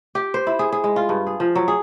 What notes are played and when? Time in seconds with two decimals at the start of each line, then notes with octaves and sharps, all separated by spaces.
0.15 G4
0.34 C5
0.47 E4
0.59 G#4
0.72 G#4
0.84 G#3
0.96 F4
1.09 G2
1.27 G#4
1.40 F3
1.55 F#3
1.68 G#4